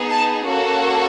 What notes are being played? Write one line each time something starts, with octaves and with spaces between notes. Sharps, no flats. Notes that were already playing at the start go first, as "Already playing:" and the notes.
Already playing: B3 D#4 G#4
A5
A#3 C#4 F#4 A4